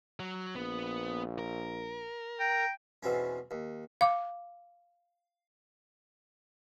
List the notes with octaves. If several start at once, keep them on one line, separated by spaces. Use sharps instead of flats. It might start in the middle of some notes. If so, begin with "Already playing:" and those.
F#3
A#1 B3
A#4
G5 A#5
E2 B2 C4 C#4
D#2
F5 D6